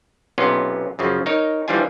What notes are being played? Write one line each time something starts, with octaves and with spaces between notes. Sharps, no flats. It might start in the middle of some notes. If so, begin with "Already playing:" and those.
B1 C3 B3 C#4 F4
F#2 C#3 F3
D#4 A#4 C#5
E3 F3 G3 D4 F4 G#5